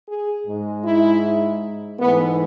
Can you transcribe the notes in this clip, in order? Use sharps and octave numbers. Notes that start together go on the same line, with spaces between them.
G#4
G#2 G#3
E4
G#2 E3 A3 B3